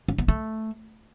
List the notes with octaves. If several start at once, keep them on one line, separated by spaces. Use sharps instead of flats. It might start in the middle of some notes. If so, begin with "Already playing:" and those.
C#4
B3
A3